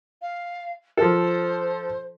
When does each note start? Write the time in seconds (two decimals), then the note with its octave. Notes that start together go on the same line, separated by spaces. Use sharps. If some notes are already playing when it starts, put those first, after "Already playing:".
0.21 F5
0.97 F3 A4 C5